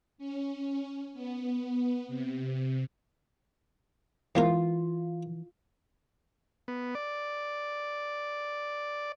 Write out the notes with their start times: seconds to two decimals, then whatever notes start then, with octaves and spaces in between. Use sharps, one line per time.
0.18 C#4
1.13 B3
2.08 C3
4.35 G#2 E3 B3 F4 A#4
6.68 B3
6.95 D5